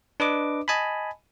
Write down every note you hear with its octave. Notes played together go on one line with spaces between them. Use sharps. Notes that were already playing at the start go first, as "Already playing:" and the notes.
D4 B4 D#5 D6
D#5 G#5 A5 B5